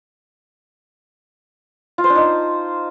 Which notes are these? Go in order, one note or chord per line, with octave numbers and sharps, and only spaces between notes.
F4
C5
D4
D#4